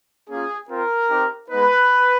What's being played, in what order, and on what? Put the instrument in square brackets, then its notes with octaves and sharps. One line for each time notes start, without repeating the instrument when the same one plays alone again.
[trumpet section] A#3 C#4 F4 G#4
C4 F4 A#4
C4 D#4 G4
G#3 B3 D#4 B4